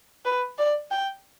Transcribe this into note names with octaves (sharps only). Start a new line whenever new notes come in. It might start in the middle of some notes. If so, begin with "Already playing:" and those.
B4
D5
G5